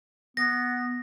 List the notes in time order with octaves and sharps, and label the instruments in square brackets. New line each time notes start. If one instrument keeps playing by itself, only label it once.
[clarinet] B3 [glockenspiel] A#6